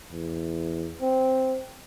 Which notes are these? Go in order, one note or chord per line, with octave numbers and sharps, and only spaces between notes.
E2
C4